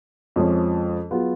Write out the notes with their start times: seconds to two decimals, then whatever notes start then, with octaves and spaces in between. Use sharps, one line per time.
0.36 F2 F3 G#3 C#4
1.11 F#3 B3 F4 G#4